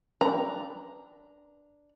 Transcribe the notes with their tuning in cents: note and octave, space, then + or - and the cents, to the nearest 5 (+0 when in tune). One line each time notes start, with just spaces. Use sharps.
D4 +0 B4 +0 A#5 +0